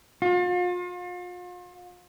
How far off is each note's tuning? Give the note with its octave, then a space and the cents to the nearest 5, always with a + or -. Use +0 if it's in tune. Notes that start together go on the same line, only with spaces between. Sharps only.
F4 +40